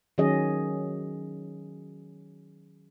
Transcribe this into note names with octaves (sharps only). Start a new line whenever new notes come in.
D#3 F#3 C#4 G#4 D#5